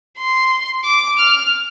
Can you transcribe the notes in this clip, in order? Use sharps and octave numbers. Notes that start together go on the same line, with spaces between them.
C6
D6
F6